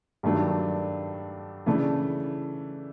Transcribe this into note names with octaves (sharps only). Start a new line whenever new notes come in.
G2 D#3 F#3 A3 D4
C#3 E3 A3 D4